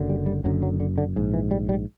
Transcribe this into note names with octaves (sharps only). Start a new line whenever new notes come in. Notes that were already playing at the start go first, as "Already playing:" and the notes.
Already playing: F#1 F#2 D3
G3
G3
F#1 F#2 D3 F#3
F#3
D3
D3
A#1 G#2
E3
G3
G3